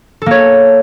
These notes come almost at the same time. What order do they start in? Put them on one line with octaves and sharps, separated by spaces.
A4 A#3 C#5